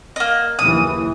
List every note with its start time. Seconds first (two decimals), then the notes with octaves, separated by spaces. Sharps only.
0.16 A#3 D#5
0.59 F#1 D#2 E3 D#6